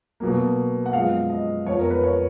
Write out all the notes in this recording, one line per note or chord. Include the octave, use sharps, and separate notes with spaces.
B2 F#3 A#3
F#5
F#2 F3 G#3 B3 F5
D#5
F2 F3 B3 C#5
A#4
B4
C#5